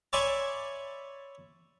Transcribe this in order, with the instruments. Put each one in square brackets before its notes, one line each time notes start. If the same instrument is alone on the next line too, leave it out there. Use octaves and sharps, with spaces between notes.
[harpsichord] C#5 D5 E5 G#5 B5 C6